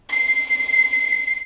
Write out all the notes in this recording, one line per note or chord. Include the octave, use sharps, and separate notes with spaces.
C7